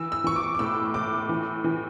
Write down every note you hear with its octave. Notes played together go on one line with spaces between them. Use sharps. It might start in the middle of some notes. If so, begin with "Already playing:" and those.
Already playing: E3 E6
E6
E3 C#6
D6
D6
A2 E6
A2 D6
E3
E3